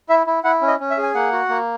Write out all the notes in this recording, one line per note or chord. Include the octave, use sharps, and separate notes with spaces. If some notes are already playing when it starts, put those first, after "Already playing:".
E4 E5
E4
E4 F#5
C#4
D#5
C#4
E5
G#4
G#5
A#3 F#5
F#4
A#3